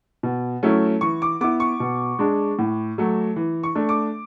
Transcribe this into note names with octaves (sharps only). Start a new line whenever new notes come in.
B2
F#3 A3 C#4 E4
E3 C#6
D6
B3 E4 D6
C#6
B2
G#3 D4
A2
F#3 A3
E3
C#6
A3 D4
D6